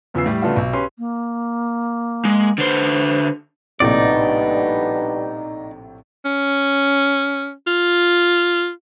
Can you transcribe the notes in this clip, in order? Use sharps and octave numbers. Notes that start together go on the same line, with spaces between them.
E2 C#3 F3 B3 E6 C7
A2 G3 G4
C#3 A3 B3 D4 F4 F#4
B1
C#4 G4 B4 C6
A#3
G#3
D3 B4 C5
A#1 A2 C3 G3 B3 D4 D#4 D5
C#4
F4